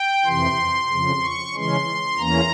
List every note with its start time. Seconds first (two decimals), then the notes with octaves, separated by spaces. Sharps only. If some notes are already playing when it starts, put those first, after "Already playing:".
Already playing: G5
0.25 F2 C3 E3 C6
0.90 F2 C#3 F3
1.22 C#6
1.54 C#3 E3 G#3 C#4 C6
2.18 E2 E3 A#3 C#4 A#5